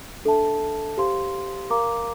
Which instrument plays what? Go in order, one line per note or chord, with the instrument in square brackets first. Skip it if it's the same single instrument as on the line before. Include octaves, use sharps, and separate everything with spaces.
[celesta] D4 A4 E5 A5
G4 C5 F5 C6
A#4 F5 A#5 D6